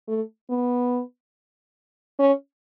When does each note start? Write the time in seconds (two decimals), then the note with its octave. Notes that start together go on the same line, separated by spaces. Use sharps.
0.08 A3
0.50 B3
2.19 C#4